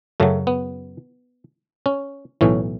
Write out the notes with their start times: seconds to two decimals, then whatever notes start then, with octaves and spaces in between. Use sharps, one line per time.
0.20 F#2 C#3 F#3 A3
0.47 B3
1.86 C#4
2.41 B1 A2 E3 C#4